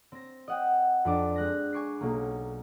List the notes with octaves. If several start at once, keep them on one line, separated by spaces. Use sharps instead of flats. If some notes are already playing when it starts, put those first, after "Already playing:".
C4 A#6
D#5 F#5 G5
F2 D4 D6
G#3 F#6 A#6
G#5 C#6 D6 C7
B1 A#3 C#6